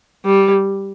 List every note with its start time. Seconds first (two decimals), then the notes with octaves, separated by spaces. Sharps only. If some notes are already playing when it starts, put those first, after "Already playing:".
0.25 G3